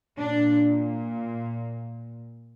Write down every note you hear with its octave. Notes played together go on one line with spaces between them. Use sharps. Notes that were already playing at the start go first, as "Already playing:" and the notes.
A#2 D4